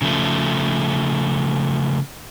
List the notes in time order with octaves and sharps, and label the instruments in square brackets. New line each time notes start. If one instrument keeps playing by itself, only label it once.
[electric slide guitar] C#3 F3 A3